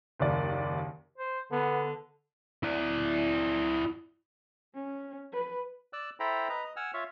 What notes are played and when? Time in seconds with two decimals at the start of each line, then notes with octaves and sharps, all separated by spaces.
0.19 F#1 D#2 D5
1.18 C5
1.51 D3 B3
2.63 E4 D5
4.74 C#4
5.33 B4
5.93 D5 E6 F#6
6.20 E4 A4 C5 G5 A#5 B5
6.49 B4 D#5 A#5
6.64 D#5
6.76 F#5 G#5 E6 F6
6.94 F4 C#5 E5 F5